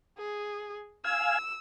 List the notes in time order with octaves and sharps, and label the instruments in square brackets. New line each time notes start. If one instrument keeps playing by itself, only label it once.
[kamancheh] G#4
[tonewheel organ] F5 G#5 [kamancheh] E6